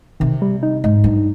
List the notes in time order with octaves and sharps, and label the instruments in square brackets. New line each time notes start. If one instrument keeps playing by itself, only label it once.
[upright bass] C3 [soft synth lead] D#3
[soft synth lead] G3
D#4
[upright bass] G#2 [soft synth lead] D#4
[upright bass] G2